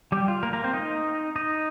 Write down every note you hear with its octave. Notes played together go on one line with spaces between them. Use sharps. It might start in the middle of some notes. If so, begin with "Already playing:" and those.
G3 G4
F4
A#3 A#4
A#3 A#4
C4 C5
D#4 D#5
D#4 D#5